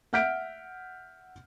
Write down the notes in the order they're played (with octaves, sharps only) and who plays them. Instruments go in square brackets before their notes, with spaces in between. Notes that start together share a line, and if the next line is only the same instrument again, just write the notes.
[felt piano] E5 F#5 F6 G6 B6 D7